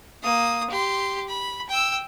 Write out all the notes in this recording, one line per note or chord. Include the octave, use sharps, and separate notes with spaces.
A#3 D#6
G4 C6
B5
G5 E6